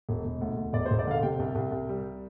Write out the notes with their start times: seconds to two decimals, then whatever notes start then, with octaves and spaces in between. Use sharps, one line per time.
0.09 E1
0.25 E1
0.41 D2
0.57 D2
0.73 E1 D5
0.86 C5
0.91 E1
0.99 D5
1.07 D3 F5
1.23 C3 G5
1.39 C2
1.55 C2
1.72 C2
1.89 G3